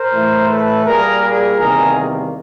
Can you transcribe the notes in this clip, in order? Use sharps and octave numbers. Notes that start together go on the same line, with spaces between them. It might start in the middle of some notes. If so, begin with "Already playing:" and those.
Already playing: A#4 C5
A2 E3 A3
A4 B4
A#2 G3 A#3 G#4 A#4
G#4 A#4
E2 C3 D#3 G3 A#3 G#4 A#4